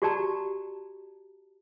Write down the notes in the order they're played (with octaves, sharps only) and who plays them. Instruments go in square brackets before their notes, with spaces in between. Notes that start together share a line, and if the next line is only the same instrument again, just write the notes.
[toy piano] F#4 G4 D5 A5 A#5